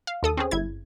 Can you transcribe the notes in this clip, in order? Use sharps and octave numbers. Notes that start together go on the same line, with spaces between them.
F5
D#2 A4 D#6
C4 C#4 G#4
G1 E4 G#6